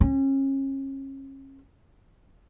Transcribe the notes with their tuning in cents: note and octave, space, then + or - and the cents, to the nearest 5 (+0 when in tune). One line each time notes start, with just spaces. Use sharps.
C#4 -35